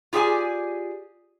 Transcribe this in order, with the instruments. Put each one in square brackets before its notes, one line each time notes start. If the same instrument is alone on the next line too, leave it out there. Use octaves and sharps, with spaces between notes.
[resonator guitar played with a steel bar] F4 G4 G#4 D5 G#5